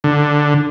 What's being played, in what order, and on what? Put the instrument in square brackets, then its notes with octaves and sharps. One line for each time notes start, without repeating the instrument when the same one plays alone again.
[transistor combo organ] D3